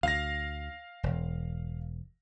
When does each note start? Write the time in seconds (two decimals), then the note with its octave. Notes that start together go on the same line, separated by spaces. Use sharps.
0.03 D2 F5 A#6
1.03 E1